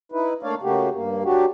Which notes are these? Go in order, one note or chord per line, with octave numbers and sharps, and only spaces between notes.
D#4 E4 B4
A3 A#3 D4 C#5 D5 F5
C#3 A3 A#3 F#4 G4
G2 A#3
F#3 D4 F#4 G4